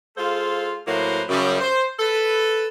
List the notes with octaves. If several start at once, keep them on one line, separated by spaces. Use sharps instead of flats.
G#3 F4 A4 C5 F5
A2 F#3 A#3 E4 B4 C5
F#2 C#3 G3
C5
A4 B4